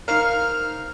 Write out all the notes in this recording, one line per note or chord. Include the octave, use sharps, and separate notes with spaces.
D#4 A#4 C5 F5 C#6 F6